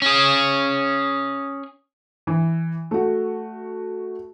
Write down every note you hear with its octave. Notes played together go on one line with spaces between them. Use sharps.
C#4 G#4
E3
A3 F#4